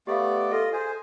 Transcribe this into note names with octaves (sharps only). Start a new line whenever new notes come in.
A3 B3 G4 D5 F5
F4 A4 D#5
G#4 C5 G#5